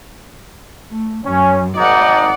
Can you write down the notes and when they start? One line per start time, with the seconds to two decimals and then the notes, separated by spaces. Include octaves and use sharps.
0.90 A3
1.25 F#2 C#4
1.77 G#1 D#4 D5 F#5